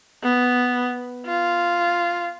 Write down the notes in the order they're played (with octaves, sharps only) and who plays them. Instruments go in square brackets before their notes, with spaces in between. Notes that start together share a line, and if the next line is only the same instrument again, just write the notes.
[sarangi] B3
F4